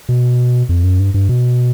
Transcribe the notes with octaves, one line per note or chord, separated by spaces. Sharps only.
B2
F2
F#2
G2
G2
B2